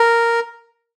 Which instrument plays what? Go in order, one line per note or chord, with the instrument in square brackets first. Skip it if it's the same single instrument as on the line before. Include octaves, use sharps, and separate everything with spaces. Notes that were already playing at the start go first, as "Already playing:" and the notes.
Already playing: [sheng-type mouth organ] A#4